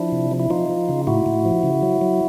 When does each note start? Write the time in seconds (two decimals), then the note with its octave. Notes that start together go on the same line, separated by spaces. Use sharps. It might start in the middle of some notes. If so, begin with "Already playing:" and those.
Already playing: F3 D4 E4
0.12 C3
0.31 F3
0.40 E4
0.50 F3 D#4 F4
0.69 F3
0.89 C#3
1.07 A2 E4 F#4
1.26 A2
1.45 F3
1.63 C#3
1.83 F#3
2.01 F#3